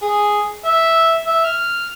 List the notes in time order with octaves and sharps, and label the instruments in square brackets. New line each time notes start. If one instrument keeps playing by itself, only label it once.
[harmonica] G#4
E5
E5
F6